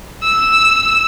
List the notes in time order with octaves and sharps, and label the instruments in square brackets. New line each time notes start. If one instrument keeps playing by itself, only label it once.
[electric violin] E6